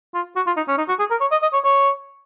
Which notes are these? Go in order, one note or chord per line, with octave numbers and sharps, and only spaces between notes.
F4
F#4
F4
D#4
C#4
D#4
F#4
G#4
A#4
C#5
D#5
D#5
C#5
C#5